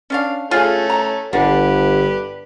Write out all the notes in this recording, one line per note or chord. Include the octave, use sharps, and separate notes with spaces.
C#4 D4 F5
A3 C#4 F4 G#4
A#5
G1 D3 G4 B4